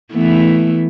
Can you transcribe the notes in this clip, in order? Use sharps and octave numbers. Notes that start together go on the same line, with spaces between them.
E3 A3 B3